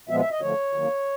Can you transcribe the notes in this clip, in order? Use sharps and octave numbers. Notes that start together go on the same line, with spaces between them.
A#2 F3 G#3 B3 E5
E5
D#5
D3 F3 A3 C#5
D#3 F#3 A#3